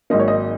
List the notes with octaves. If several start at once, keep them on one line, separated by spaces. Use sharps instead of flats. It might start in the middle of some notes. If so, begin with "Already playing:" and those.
G#1 G#2 F#3 A#3 D#5
C#5
D#5